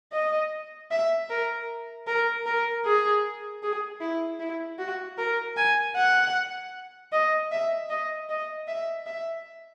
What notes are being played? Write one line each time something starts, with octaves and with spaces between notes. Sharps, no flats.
D#5
E5
A#4
A#4
A#4
G#4
G#4
E4
E4
F#4
A#4
G#5
F#5
D#5
E5
D#5
D#5
E5
E5